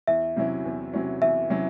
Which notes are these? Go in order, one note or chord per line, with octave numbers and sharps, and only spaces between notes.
E2 E5
C3 F#3 C#4 E4
E2
C3 F#3 C#4 E4
E2 E5
C3 F#3 C#4 E4